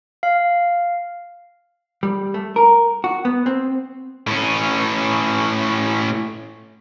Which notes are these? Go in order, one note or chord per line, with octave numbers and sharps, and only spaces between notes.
F5
G3
A3
A#4
F#4
B3
C4
A2 C#4